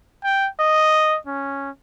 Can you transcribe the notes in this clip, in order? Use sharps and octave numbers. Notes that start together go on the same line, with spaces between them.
G5
D#5
C#4